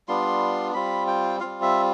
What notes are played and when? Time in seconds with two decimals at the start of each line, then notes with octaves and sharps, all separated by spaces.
0.08 G3 B3 D4 F4 C6
0.74 G3 C4 F4 B5
1.07 G5
1.40 G3 C4 F4 F5
1.62 E5